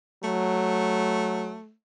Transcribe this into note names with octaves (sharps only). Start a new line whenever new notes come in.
F#3 A3